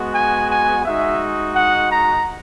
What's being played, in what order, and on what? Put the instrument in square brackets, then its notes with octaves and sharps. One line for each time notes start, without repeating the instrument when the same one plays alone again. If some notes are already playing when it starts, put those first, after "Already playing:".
Already playing: [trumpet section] G#3 B3 F#4
G#5
G#5
G#3 D#4 F#4 E5
F#5
A#5